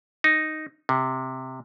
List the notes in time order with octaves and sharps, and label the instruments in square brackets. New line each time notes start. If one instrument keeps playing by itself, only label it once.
[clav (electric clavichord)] D#4
C3